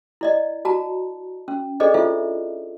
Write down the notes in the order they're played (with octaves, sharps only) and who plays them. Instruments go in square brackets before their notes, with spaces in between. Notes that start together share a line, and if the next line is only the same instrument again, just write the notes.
[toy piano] E4 D5 D#5
F#4 A5 A#5
C#4
D4 G#4 A4 C5 D5 D#5
E4 F4 A4 C5 E5